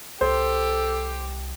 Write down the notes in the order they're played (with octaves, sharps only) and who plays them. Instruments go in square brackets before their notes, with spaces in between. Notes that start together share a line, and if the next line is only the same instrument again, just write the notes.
[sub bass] C2 [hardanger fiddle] G4 [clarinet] A4 [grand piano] C5